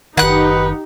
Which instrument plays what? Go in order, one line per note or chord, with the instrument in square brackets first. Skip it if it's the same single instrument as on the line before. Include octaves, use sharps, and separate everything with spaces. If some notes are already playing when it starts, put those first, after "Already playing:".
[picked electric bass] F#1 D#3 [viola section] D#4 G4 [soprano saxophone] B4 [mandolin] F#5 F#6